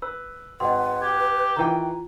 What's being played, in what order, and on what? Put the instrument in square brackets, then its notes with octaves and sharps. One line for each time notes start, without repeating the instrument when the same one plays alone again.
[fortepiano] B4 [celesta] E6
[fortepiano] G#1 [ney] B4 [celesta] D#5 F#5 C6
[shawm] G4 [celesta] G#6
[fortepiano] D#3 E3 G5 [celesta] F4 A#5